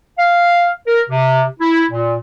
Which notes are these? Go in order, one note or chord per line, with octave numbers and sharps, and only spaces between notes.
F5
A#4
C3
E4
A#2